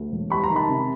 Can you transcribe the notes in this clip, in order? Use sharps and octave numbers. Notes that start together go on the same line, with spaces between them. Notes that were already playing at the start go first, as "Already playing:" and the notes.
Already playing: D2
E1
G3 B5 C#6
A#5 C6
D#3
A5 B5
C3